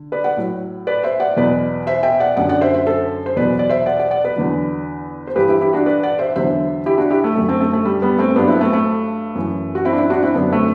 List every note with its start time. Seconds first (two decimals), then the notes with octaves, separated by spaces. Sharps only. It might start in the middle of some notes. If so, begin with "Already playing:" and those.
Already playing: D3
0.12 B4 D5
0.24 D5 F#5
0.37 A2 F#3
0.87 B4 D5
1.04 C5 E5
1.20 D5 F#5
1.37 E2 B2 F#3 B4 D5
1.87 C5 E5
2.03 E5 G5
2.20 D5 F#5
2.36 F#2 D3 F#3 D5 F#5
2.49 D5 F#5
2.61 C5 E5
2.74 C5 E5
2.87 A4 C5
3.26 C5
3.36 E2 B2 F#3 B4 D5
3.59 D5
3.69 C5 E5
3.86 D5 F#5
3.99 D5 F#5
4.11 D5 F#5
4.25 B4 D5
4.36 E2 D3 F#3
5.27 C5
5.36 G2 E3 G4 B4
5.48 E4 G4
5.61 E4 G4
5.73 D4 F#4
5.86 B4 D5
6.03 D5 F#5
6.19 C5 E5
6.36 E2 D3 F#3 C5 E5
6.86 E4 G4
6.98 D4 F#4
7.11 E4 G4
7.24 A3
7.35 F#2 D3 F#3 A3
7.48 A3 C4
7.61 A3
7.73 A3
7.85 G3
8.02 G3 B3
8.18 A3 C4
8.36 G2 F#3 B3 D4
8.48 C4 E4
8.55 B3
8.61 A3 C4
8.73 A3
9.35 F#2 E3
9.75 F#4
9.85 C4 E4
9.92 D4
9.98 C4 E4
10.10 D4 F#4
10.23 C4 E4
10.35 F#2 D3 F#3 B3 D4
10.52 A3 C4